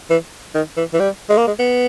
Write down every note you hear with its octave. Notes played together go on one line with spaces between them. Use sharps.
E3
D#3
E3
E3
G3
G#3
A#3
G#3
B3